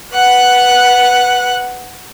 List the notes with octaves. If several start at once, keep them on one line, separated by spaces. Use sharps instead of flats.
B4 F#5 F#6